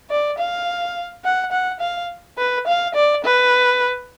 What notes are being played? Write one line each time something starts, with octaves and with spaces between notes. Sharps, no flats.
D5
F5
F#5
F#5
F5
B4
F5
D5
B4